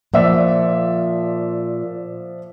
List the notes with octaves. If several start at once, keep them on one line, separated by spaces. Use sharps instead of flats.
A#2 F3 D5 E5